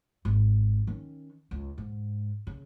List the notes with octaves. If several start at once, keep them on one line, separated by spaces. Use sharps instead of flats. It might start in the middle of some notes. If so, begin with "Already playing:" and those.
G#1
D#3 C#4
C#2
G#2
C#3